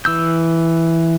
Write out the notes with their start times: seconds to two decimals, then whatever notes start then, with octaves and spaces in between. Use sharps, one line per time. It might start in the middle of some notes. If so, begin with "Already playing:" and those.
0.05 E3 E6 G6